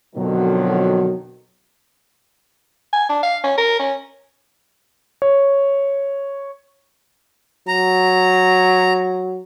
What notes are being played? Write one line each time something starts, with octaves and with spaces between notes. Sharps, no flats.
F2 B2 D3 D#3 F3 F#3
G#5
D4
F5
C#4
A#4
C#4
C#5
F#3 A#5